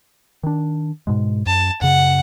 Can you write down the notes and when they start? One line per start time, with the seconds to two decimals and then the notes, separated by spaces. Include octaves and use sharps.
0.43 D#3 D4
1.07 G#2 B2 G#3
1.46 F#2 A5
1.82 F#2 C#3 F#5